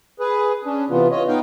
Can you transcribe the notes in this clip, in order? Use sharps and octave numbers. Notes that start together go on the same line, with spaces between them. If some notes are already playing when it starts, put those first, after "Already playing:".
G#4 B4
C#4 D4
C3 E3 B3 F4
F4 C#5 D#5
B3 D#4 F5 G5